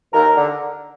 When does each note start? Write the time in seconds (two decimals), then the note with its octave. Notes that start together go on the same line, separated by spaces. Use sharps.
0.12 D#2 A#4
0.36 D3